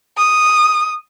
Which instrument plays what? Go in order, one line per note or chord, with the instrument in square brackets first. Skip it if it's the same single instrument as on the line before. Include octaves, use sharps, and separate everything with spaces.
[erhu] D#6